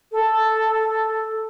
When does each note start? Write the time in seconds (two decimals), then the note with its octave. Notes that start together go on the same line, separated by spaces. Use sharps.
0.11 A4